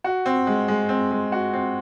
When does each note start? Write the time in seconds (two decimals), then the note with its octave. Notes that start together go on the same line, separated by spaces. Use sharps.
0.04 F#4
0.26 C4
0.47 G#3
0.68 G#3
0.89 C4
1.11 G#3
1.32 F#4
1.53 C4